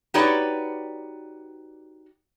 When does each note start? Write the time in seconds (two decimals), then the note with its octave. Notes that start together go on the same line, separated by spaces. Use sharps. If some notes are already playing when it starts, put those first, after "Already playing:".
0.14 D#4 F#4 G4 B4 C#5 D5